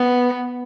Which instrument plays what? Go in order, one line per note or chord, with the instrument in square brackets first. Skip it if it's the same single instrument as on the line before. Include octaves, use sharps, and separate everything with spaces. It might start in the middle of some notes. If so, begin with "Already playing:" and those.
Already playing: [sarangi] B3